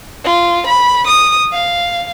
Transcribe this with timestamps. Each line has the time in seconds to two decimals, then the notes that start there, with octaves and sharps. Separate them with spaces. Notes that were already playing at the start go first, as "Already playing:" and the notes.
0.24 F4
0.66 B5
1.06 D#6
1.52 F5